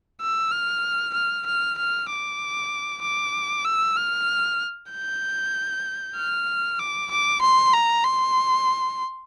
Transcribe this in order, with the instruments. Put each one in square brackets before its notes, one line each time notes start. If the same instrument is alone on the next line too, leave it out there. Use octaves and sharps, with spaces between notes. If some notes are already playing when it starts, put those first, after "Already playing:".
[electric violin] E6
F6
F6
F6
F6
D6
D6
E6
F6
G6
F6
D6
D6
C6
A#5
C6